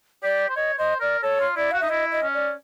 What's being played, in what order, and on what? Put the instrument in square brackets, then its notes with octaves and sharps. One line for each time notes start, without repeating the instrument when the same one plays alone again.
[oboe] G4 [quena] D5
[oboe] C5
[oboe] C#5 [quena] D#5
[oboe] C5 [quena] D#5
[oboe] A#4 [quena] D5
[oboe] A4 [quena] C#5
[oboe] F4
[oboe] E4 [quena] D5
[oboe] F#4 [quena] F5
[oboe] D#4 [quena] E5
[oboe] E4 [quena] D#5
[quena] D#5
[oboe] C#4
[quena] D5